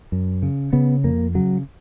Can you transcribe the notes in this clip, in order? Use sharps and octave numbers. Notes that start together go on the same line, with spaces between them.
F#2
C#3
C#3 B3
F2 A#3
C#3 F#3